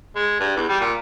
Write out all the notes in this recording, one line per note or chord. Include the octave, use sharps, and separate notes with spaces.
G#3
G2
E2
G3
A#2